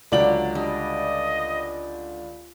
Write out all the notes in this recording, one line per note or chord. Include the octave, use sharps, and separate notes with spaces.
C#2 D3 F#3 D5 G5 F#7
G3 D4 D#5